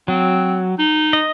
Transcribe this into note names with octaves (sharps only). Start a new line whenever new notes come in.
F#3 C4
D#4
D#5